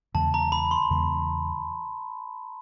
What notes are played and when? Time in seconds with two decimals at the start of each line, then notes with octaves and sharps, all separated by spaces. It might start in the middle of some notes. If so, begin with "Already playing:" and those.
0.14 E2 C#3 E3 G#3 A5
0.34 A#5
0.52 B5
0.71 C6
0.90 E2 C#3 E3 G#3